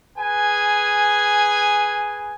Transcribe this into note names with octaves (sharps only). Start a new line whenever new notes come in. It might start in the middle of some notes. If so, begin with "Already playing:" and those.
G#4 B4 G#5